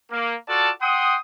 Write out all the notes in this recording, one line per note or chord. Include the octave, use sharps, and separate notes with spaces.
A#3
F4 F#4 A4 D5 A5
F#5 G5 C6 D#6